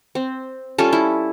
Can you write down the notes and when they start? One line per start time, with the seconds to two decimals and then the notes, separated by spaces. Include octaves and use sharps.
0.15 C4
0.78 G3 C#4 F4 A4
0.93 E4